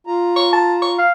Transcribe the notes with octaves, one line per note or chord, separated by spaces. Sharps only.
F4 A#5
C#6
A5
C#6
F5